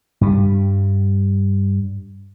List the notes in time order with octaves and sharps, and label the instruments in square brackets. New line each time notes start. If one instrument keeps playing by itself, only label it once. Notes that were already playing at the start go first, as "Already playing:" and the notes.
[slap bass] G2 G3